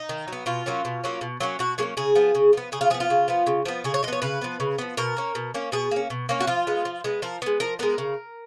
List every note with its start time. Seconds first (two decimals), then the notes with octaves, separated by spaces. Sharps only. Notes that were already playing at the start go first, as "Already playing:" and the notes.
Already playing: D#4
0.09 D#3
0.28 F#3 B3
0.46 B2 F4
0.66 F#3 A#3 C#4
0.85 B2
1.04 F#3 A#3 C#4
1.21 B2
1.40 F#3 A#3 C#4
1.59 B2 F#4
1.78 F#3 A#3 C#4 G#4
1.97 C#3 G#4
2.15 F3 B3
2.35 C#3
2.53 F3 B3
2.72 C#3 G#4
2.81 F4
2.90 F3 G#4
2.94 B3
3.00 F4
3.10 C#3
3.28 F3 B3
3.47 C#3
3.65 F3 B3
3.84 C#3 G#4
3.94 C#5
4.03 F3 D#5
4.08 B3 C#5
4.22 C#3 B4
4.42 F3 B3
4.60 C#3
4.79 F3 B3
4.97 B2 A#4
5.17 A#3 C#4
5.35 B2
5.54 A#3 C#4
5.72 B2 G#4
5.91 A#3 C#4
6.10 B2
6.29 A#3 C#4
6.40 F#4
6.47 F3 F4
6.67 G#3 B3
6.85 F3
7.04 G#3 B3
7.22 F3 A#4
7.42 G#3 B3
7.60 F3 A#4
7.79 G#3 B3 A#4
7.98 C#3